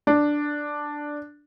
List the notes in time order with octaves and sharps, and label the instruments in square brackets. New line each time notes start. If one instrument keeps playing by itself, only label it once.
[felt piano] D4